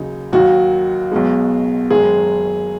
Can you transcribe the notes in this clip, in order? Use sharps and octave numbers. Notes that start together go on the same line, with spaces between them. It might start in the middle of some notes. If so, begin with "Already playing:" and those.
Already playing: D#2 C#3 F#3 D#4
D#2 D#3 F#3 F#4
B1 B2 G#3
F#1 F#2 D#3 G#3 G#4